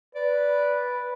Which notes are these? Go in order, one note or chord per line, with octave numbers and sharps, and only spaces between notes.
B4 D5